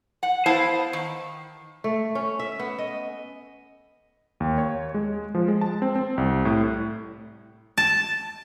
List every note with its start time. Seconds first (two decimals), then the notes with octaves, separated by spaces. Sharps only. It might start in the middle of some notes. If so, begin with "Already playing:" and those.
0.23 F#5
0.46 B3 E4 C5 F5 A5
0.93 D#3
1.84 A3
2.15 C#4
2.39 E5
2.59 B3
2.78 D#5
4.40 D#2
4.58 C#5
4.94 G#3
5.35 F3
5.48 G#3
5.61 A5
5.82 C4
5.95 C4
6.18 C2
6.45 A2
7.78 A5